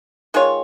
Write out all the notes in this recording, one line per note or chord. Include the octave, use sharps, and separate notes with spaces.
D#3 G#3 F4 C#5